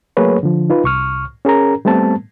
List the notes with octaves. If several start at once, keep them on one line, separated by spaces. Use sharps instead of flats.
F#3 A3 A#3 G#4 B4 C#5
D3 F3
D#4 F4 B4
C2 C#6 F6
C#4 G#4 A#4 A#5
G3 A3 B3 C4 A5